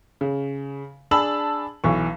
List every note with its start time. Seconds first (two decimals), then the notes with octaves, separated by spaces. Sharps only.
0.21 C#3
1.11 D4 G#4 A5 B5 E6 F#7
1.84 B1 E3 C#6